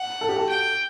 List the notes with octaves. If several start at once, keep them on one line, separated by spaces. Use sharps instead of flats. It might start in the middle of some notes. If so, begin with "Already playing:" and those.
Already playing: F#5
A4
G4
F#4 A4
G5